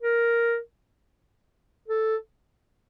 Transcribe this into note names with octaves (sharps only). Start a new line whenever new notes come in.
A#4
A4